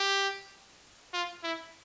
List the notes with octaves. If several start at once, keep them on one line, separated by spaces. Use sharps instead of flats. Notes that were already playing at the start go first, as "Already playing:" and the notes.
Already playing: G4
F4
E4